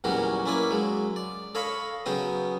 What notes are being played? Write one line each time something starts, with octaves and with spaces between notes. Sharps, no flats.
E2 A#2 F#3 G3 C#4 F#4
A#3 C#4 E4 D5 G#5
F#3 G#3
D5
A4 C#5 D#5 F5 B5
C#3 F#3 B3 G5 D#6